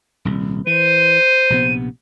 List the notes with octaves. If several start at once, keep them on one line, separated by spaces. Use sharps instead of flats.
D#1 C2
E3 C5 D#7
A#1 C3 B3